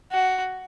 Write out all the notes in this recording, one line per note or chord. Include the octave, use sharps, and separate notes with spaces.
F#4